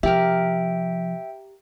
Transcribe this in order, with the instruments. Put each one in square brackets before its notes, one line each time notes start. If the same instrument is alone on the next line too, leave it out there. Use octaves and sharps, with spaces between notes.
[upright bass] C3 F3 [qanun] G4 A#4 [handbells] E5 G5